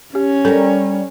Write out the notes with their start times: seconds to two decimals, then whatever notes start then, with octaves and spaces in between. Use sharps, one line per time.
0.15 C#4 G4
0.45 G3 A4 A#4